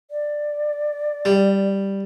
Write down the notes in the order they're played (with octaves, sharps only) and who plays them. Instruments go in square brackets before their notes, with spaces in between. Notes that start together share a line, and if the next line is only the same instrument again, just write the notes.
[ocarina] D5
[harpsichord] G3